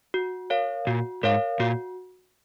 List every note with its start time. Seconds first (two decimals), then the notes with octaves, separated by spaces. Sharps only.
0.14 F#4
0.50 A#4 C#5 F5
0.87 A#2 F#4
1.23 G#2 A#4 C#5 F5
1.60 A#2 F#4